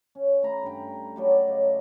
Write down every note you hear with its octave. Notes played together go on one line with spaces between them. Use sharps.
C#4
A3 A#5 B5
G2 G5
F#3 G3 A3
D5 D#5
C#3